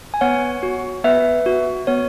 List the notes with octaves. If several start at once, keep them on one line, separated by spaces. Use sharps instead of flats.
G#5
B3 C#5 F#5
F#4
B3 B4 E5
F#4
B3 C#5